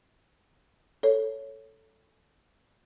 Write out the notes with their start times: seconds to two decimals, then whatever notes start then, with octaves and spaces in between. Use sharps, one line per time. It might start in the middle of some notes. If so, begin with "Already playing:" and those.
1.03 A4 C#5